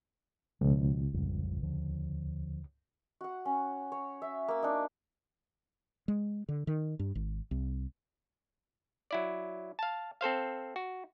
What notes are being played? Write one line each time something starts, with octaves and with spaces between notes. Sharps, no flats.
C#2 B2 F3
A1 F2 G3
D#2 D3 F3
F#4 F#5
C#4
C#5
E5
A#3 E6
D4 D#4
G#3
D3
D#3
G2
G#1
C2
F#3 E4 D5
F5 A5
C4 A4 C5 F5
F#4